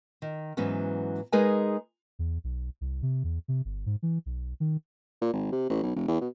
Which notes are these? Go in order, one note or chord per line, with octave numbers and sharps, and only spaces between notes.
D#3
G#2 E3 F#3 B3 C#4
G#3 D#4 G#4 A#4 B4 G#5
E2
B1
C2
C3
E2
C3
G1
G#2
E3
B1
D#3
A#2
G#1
C3
A1
B1
F1
E2
B2